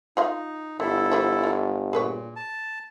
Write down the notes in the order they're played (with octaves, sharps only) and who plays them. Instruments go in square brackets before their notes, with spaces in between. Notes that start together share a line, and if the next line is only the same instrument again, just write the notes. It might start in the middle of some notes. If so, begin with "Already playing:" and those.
[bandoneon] D#4 [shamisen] F4 D#5 F5
[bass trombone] G1 [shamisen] G3 [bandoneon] E4 A4
[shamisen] F3 G3 A3
F4
[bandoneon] A#2 [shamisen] G#4 B4 C#5
[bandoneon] A5